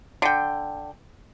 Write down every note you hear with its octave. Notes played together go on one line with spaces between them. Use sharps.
D3 G5